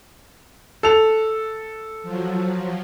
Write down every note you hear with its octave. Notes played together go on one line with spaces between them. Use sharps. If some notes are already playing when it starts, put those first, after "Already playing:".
A4 F7
F3 F#3